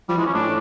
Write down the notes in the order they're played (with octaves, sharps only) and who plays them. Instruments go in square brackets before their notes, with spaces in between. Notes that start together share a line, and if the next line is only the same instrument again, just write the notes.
[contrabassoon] F3 [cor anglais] G3
[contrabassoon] E3 [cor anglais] G#3
[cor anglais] C#4
[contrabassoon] A2 [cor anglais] D4